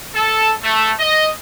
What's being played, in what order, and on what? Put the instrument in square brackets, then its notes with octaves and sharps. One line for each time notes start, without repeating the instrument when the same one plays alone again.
[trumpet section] A4
A3
D#5